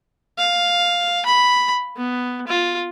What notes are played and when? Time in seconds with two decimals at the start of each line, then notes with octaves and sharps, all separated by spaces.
0.38 F5
1.26 B5
1.97 B3
2.48 F4